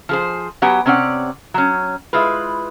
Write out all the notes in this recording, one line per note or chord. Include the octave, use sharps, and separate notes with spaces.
F3 G#4 C5
F#3 B3 G4 B4 F#5 G#5
C3 C4 C#4 D5 F#5
F#3 C#4
G#3 E4 F4 B4